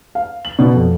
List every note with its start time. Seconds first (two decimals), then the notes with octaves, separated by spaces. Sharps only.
0.15 F5
0.45 F#7
0.59 B2
0.74 F2